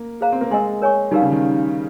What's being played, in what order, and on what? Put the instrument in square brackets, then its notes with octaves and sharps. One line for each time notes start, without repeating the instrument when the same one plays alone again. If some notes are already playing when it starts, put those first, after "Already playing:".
Already playing: [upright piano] A#3
[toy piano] G#4 C5 F5 A#5
[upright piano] C4
A#3
[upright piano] G#3 [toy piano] A#4 D#5 G#5 C6
[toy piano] A#4 C#5 G#5 C#6
[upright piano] G3 [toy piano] D#4 G4 A#4 F5
[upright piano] C#3
D#3